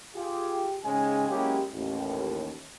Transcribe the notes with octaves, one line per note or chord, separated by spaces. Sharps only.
F4 G4 G#4
G#2 C#3 G#3 C#4 G4 G#5
F#3 G#3 A#3 C#4 E4 G4
A1 D#2